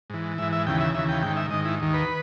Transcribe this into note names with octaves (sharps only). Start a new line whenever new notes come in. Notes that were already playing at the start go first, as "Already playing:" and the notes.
G#2 E3
G#2 E3 E5
E5
D#2 C#3 E3 G5
E5
D#2 C#3 E3 E5
G5
G#2 D#3 G5
E5
G#2 D#3 D#5
E4
D#2 D#3
B4